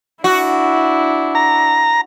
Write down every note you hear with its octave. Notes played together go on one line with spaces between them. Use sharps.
D4 E4 F#4
A#5